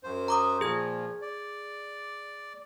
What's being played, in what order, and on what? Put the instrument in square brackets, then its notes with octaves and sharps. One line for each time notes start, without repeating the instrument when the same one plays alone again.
[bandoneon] F#2 C5
[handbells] A#5 D6 D#6
[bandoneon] A#2 F3 [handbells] G#4 G#6
[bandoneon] D5